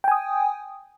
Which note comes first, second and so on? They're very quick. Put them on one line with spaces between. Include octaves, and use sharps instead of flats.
G5 G#5 D#6